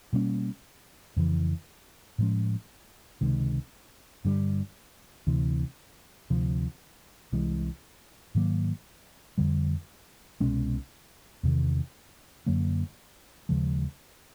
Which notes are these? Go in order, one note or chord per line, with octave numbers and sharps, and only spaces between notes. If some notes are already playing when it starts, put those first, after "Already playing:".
B2 G3 A#3 C#4
F2 C#3 E3
A2 F3 G#3 C#4
C#2 C3 D#3 G#3
G2 D3 G3
D2 C3 E3
D2 C3 F3
C2 C3 E3 G#3
G#2 D#3 F#3 A#3
F2 D3 G3
C2 B2 G#3 C#4
E2 C3 D#3
F#2 D3 F#3 A#3
D#2 C#3 F3 G#3